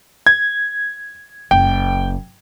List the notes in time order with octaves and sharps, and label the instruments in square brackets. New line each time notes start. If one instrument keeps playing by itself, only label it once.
[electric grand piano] G#6
[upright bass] F#1 [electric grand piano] G5